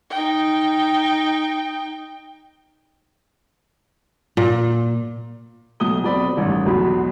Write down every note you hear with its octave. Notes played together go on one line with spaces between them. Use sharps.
D#4 G5
A#2
B1 A3 D#6 G7
B1 C4 D5 B5
A1 G2 D#3 G3
B1 E2 F#4 B5 C6